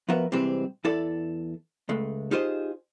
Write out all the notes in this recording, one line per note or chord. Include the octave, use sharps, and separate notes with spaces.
F3 B3 F#4 A#4 B4 E5
C3 E3 G3 G#3 C4
E2 E4 A4 D5
C#2 G#3 A3
D#4 F4 G4 G#4 C5 D#5